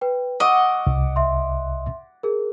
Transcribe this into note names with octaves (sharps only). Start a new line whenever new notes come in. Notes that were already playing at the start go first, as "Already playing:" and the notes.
B4 G5
D#5 F#5 C#6 D6 E6
C2
E5 C6
G#4 A#4